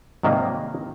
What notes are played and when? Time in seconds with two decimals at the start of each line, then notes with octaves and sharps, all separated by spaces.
0.23 G#2 C3 D#3 F#3 G3 A#3